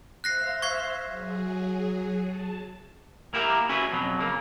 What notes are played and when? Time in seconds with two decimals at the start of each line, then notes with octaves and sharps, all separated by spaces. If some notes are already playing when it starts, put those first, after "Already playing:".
0.24 C5 E5 F5 F#6 A#6 C7
0.62 C#6 G#6 C7
1.04 F#3 G#4
2.22 A5
3.34 A#3 E4 G4 G#4 A#4
3.69 C#4 E4 F#4 G#4 B4
3.92 F2 B2 F#3
4.19 C#3 A#3